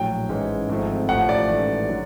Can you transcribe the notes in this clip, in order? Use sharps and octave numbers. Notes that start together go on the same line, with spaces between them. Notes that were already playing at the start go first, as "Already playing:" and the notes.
Already playing: A#1 A2 F#3 G5
A1 G#2 E3 G#3 C#4
G#1 G#2 F3 A3 C4
A1 A2 F3 A3 F#5
D5
A1 G#2 E3 A3
D3 F#3